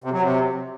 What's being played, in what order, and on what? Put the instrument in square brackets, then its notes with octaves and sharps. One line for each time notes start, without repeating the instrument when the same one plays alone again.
[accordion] C3
F#3
C3